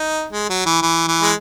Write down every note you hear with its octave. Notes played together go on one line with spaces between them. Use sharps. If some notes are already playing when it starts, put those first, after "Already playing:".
Already playing: D#4
G#3
F#3
E3
E3
E3
G#3